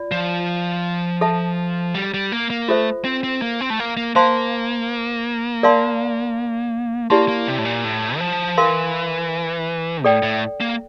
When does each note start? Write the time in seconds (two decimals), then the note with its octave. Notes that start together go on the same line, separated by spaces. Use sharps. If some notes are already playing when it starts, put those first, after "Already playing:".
Already playing: F4 D5
0.11 F3
1.21 A4 E5 A5
1.95 G3
2.14 G3
2.32 A#3
2.50 A#3
2.68 A3 F4 A4 C5 E5
3.05 C4
3.23 C4
3.42 A#3
3.61 C4
3.70 A3
3.80 A#3
3.97 A#3
4.15 A#3 C5 F5 A5 C6
5.63 A#4 D5 F5 A5 C6
7.10 A#3 E4 G4 D5 A5 C6
7.28 A#3
7.48 C3
7.58 A2
7.65 A#2
7.84 A2
8.16 E3
8.21 F3
8.58 E3 A#4 F5 C6
10.04 A2 A4 D5 G5
10.23 A2
10.61 A#3